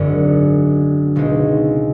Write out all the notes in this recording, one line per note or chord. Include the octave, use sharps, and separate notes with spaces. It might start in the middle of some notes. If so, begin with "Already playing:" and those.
Already playing: G#1 F#2 D3
C#2 B2 G#3 C4 D#4